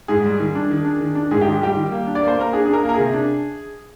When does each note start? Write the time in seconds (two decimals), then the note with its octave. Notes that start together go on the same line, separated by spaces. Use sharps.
0.08 G#2 G#4
0.24 G3
0.40 D#3
0.55 D4
0.71 D#3
0.85 D4
1.01 D#3
1.15 D4
1.31 G#2 G#4
1.41 D#3 G4
1.61 G3 G4
1.76 D#3
1.92 A#3
2.07 D4
2.15 D5
2.23 A#3 C5
2.38 A#3 A#4
2.53 D4 G#4
2.65 D4 G#4
2.73 A#4
2.83 A#3
2.89 A#4
2.94 C3 G#4
3.13 D4